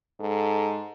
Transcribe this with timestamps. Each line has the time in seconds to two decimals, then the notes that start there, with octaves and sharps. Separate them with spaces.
0.20 G#2 A4